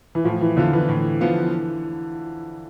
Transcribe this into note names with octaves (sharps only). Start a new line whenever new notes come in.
E3
A2 F3
E3
D3 F3 B3 F4
E3
A2
F3 B3 F4